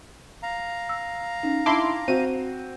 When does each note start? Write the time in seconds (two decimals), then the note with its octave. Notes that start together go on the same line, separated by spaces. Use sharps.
0.43 F5 A#5
0.89 E6
1.43 C#4 D#4
1.66 D4 E4 A5 C6 D6
2.08 C4 F#4 D#7